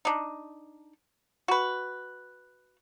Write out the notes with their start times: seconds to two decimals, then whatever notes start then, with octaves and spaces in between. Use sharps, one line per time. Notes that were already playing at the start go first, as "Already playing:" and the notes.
0.05 D4 D#4
1.48 F#4 B4